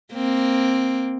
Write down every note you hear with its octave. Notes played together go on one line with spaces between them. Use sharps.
A#3 C4